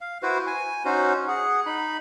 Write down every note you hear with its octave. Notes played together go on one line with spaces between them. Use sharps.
F5
E4 F#4 B4 C5
G#5
C#4 D#4 F#4 C5
G#4 F#5
D#4 B5